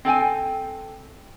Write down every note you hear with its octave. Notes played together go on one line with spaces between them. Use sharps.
C4 A4 G5 G#5